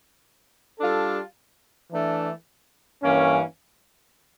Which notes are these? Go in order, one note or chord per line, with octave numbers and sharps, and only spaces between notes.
G3 D4 F4 A4
E3 A3 D4
G2 E3 A#3 C#4